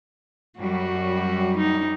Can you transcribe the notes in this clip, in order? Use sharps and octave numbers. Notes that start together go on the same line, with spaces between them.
F#2 F#3 G3 F#4
D#4